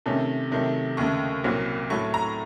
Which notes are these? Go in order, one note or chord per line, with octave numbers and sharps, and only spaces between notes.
C3 D#3 A3 C#4
C3 D#3 F#3 A3
D#2 C#3 A3 C#6
C2 A#2 F#3 C4
A2 F#3 A3 C#6
A#5